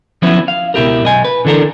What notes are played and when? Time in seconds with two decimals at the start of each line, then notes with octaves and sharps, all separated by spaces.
0.22 F3 F#3 B3 C#4 E4
0.48 F5
0.74 C#2 B2 E4 G4 A#4
1.03 B1 D#5 G#5
1.25 B4
1.45 D3 E3 D4 A4 A#4